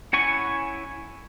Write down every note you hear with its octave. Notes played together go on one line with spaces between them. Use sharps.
C#4 E4 F#5 G#5 C#6